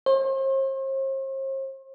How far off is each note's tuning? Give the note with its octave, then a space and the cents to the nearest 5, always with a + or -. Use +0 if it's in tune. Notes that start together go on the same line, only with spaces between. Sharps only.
C5 +45